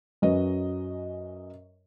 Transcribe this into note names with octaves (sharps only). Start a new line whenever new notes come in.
F#2 F#3 C#4 B4 D#5